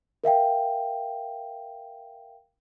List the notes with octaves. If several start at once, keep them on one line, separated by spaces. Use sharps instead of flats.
A#4 E5 F5 G5